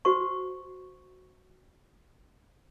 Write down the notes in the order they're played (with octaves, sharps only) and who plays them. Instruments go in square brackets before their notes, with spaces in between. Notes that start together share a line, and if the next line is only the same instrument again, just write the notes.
[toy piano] F#4 C5 C#6